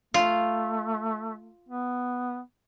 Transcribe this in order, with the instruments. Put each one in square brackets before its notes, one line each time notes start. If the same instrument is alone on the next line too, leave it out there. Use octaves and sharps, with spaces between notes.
[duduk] A3 [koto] F4
[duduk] B3